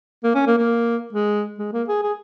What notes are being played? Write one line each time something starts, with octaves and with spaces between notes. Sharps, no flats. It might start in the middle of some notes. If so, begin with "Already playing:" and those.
A#3
C#4
A#3
A#3
G#3
G#3
A#3
G#4
G#4